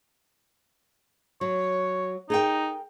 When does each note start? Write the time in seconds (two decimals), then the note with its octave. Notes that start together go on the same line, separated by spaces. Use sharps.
1.41 F#3 C#5
2.30 D#4 G#4 A#4 G5